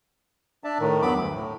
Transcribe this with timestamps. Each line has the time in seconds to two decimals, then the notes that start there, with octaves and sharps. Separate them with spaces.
0.64 D4 D5 E5 A5
0.80 A2 D#3
1.02 E2 G2 F#3 B3 B5 D6
1.15 D2
1.35 A2